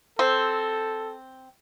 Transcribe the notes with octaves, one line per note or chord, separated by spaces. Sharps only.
C4 A4